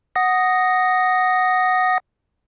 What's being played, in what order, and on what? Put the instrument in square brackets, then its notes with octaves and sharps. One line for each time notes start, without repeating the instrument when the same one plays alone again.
[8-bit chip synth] F#5 D#6 A#6